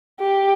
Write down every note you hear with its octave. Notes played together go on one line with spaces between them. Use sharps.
G4